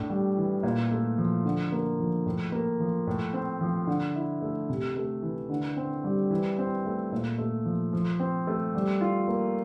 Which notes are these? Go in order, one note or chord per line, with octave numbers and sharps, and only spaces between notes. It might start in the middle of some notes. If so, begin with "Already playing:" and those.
Already playing: A2 D4
G3
E3
A#2
A3
F3
D3
A#3
F3
A2
A#3
F3
A2
C4
F3
D3
E4
A3
C3
A3
E3
D3
C4
G3
E3
C4
A3
A#2
A3
F3
F3
C4
A3
G3
F4
A#3